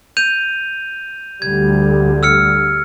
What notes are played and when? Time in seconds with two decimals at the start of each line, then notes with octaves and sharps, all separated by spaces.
0.17 G6 D#7 F7
1.42 D2 D3 G3 G#6
2.23 E6 F6 C#7